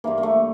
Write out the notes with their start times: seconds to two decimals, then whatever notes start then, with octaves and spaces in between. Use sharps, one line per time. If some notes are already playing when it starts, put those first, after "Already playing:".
0.04 G2 E3 A#3
0.18 A#3
0.23 A3